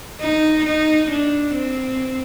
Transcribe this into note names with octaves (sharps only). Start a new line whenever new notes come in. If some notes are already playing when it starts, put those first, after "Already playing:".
D#4
D#4
D4
C4